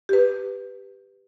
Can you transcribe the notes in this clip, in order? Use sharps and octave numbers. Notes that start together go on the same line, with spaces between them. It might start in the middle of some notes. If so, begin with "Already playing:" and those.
G4 B4